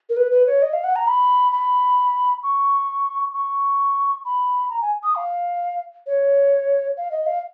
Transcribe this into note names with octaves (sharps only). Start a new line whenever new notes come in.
A#4
B4
B4
C#5
D#5
F5
F#5
A#5
B5
B5
C#6
C#6
B5
A#5
G#5
D#6
F5
C#5
F5
D#5
F5